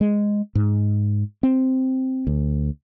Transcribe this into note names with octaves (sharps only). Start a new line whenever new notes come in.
G#3
G#2
C4
D2